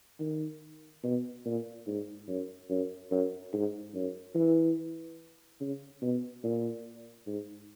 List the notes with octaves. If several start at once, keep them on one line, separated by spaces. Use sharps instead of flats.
D#3
B2
A#2
G#2
F#2
F#2
F#2
G#2
F#2
E3
C#3
B2
A#2
G#2